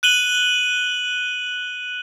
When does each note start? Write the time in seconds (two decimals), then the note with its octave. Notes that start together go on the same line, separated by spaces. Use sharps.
0.03 F#6 D#7 F#7 G7